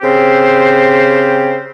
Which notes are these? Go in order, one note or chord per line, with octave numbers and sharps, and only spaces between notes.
C#3 C4 G4 C5